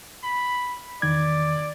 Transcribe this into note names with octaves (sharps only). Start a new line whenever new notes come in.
B5
E2 D#3 D5 G#6